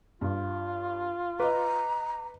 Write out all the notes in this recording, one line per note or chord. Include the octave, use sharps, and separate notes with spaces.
G2 F4
B4 D#5 A#5 D6